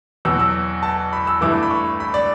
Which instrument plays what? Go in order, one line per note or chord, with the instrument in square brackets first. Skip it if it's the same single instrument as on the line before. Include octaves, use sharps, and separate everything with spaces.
[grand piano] E2 B2 F#3 E6
E6
A5
B5
E6
G2 E3 A3 E4 D6
B5
C#6
B5
D5